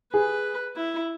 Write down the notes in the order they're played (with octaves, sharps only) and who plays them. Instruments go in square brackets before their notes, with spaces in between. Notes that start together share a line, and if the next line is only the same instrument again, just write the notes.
[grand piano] G#4 [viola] B4
[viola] E4